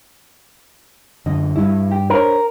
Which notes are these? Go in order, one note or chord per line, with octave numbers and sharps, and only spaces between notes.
F#2 D3 D#5
G2 G3 E4
G4
D4 A#4 C5 C#5